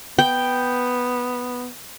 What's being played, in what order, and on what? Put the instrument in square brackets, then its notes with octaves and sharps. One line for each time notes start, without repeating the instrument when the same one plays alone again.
[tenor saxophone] B3 [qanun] G5